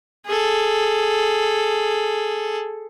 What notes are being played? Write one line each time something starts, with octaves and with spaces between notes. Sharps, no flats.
G#4 A4